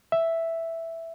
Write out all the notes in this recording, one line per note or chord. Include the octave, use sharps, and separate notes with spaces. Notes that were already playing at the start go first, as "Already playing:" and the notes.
E5